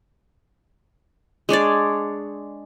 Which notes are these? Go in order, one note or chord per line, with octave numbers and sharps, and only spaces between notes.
G#3 D4 C#5 D5